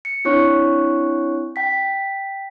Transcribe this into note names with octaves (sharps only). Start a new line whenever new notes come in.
C#7
C4 D4 E4 C#5 C#6 F#6
G5 B6